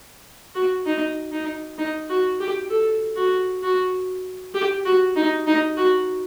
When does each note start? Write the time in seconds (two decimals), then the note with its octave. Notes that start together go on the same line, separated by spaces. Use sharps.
0.55 F#4
0.86 D#4
1.32 D#4
1.78 D#4
2.09 F#4
2.40 G4
2.70 A4
3.16 F#4
3.62 F#4
4.54 G4
4.85 F#4
5.16 D#4
5.47 D#4
5.77 F#4